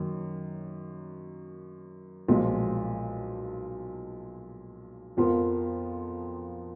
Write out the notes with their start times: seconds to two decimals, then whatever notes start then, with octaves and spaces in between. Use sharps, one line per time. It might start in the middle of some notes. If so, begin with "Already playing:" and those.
Already playing: F#2 D#3 A#3 C#4
2.28 B1 A#2 F3 G#3
5.17 F2 F3 B3 F4 A#4